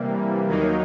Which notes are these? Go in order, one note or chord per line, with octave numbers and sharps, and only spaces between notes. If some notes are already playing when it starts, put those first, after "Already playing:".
Already playing: C3 E3 G3 A#3
D#2 D#3 F#3 A#3 D#4